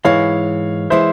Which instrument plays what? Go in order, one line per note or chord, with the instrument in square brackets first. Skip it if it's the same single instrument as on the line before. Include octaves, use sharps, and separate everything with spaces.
[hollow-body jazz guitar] G#2 E3 G#3 E4 [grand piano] C#5 F5
[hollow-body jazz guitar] E3 G#3 E4 [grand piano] C5 E5